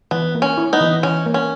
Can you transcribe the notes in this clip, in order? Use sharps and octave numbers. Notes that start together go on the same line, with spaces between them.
E3 B3
A#3
C#4
E4
B3 D#4
E3
E3 C#4
A#3
C#4